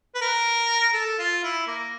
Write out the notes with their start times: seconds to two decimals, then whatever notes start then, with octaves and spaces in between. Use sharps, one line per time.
0.15 B4
0.21 A#4
0.94 A4
1.19 F4
1.44 E4
1.67 A#3